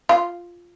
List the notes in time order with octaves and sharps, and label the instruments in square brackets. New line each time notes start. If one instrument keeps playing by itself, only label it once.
[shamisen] F4